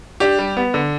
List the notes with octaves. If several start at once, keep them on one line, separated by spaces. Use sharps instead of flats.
D4 G4
G3
B3
D3